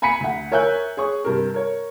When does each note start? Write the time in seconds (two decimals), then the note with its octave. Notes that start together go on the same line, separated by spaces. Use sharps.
0.02 G#5 A#5 B5 B6 C#7 D#7
0.20 D2 F#5
0.51 A#4 C#5 E5 G#5 F#6 G6
0.97 G#4 C#5 C#6
1.25 G2 C3 A#4
1.54 A#4 C#5